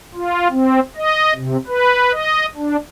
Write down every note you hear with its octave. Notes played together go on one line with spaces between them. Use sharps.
F4
C4
D#5
C3
B4
D#5
D4